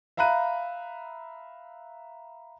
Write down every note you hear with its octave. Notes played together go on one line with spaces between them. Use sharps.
E5 F5 A#5 B5 F#6 D#7